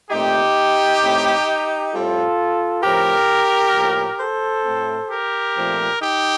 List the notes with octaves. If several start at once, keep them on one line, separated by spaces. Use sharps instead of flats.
A#2 A3 C4 D#4 G4
A2 A3 C4
A2 G3 C4 F4 A4
A2 F3 A3 C4 G4 A#4
A2 F3 A#3
A4 C5
A2 A3 C4
G4 A#4
A#2 F3 A3 C4
D#4 G4